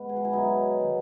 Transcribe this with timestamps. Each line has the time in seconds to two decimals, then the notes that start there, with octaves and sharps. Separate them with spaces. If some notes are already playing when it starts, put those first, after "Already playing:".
Already playing: G#2 B3
0.09 G#4
0.16 F#4
0.25 E4
0.33 B2 F#3 B3 D#4
0.80 D#3 G#3 B3